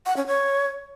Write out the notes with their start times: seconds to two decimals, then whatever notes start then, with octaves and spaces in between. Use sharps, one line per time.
0.06 F#5
0.16 C#4
0.27 C#5